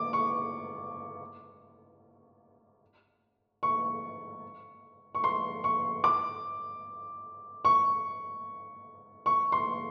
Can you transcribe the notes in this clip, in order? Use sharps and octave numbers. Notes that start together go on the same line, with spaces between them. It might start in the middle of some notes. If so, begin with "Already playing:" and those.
Already playing: D6
C#6
C#6
C#6
C6
C#6
D6
C#6
C#6
C6